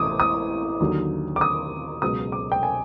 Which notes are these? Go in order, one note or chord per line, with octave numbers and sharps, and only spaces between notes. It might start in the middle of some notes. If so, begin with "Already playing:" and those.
Already playing: A1 A2 E3 D6 D#6
D#6
D#2 D3 F#3
D6
D#6
C#2 B2 F#3 D#6
D6
G5
G#5